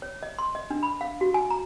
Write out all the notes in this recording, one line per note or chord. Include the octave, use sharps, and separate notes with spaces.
C#5
D#5
C6
D#5
D4
B5
F5
F#4
G#5
A#5